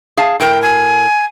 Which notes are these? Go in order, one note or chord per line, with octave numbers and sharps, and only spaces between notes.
G#4 F5 A5
A2 A#4 G5
G#5